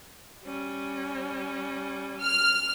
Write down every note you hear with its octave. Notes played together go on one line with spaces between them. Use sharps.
G3 C#4
F6